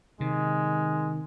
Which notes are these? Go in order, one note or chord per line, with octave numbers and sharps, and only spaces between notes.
C3 D#3 G#3